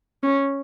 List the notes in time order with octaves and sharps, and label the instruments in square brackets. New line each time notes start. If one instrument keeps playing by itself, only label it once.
[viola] C#4